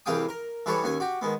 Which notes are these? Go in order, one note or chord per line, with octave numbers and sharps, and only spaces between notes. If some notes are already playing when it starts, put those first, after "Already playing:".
C2 E3 G#4 F5 G5 D#6
A#4
E3 G3 G#4 A4 B4 C#5
D#2 C#4 G#5
F#4 G4
D#3 G#3 B3